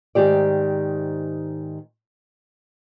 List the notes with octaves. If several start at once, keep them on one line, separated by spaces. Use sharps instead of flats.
G#2 D#3 G4 D5